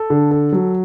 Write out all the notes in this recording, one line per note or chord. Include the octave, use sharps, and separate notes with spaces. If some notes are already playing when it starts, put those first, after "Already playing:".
Already playing: A4
D3
A4
F#3